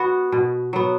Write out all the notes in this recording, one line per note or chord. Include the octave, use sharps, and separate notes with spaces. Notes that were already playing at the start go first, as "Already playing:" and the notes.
Already playing: B3 F#4
B2
F#3 B3